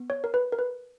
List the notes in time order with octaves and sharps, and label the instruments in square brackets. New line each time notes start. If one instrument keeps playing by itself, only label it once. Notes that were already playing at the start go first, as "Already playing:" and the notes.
Already playing: [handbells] B3
C#5
A#4
B4
A#4
B4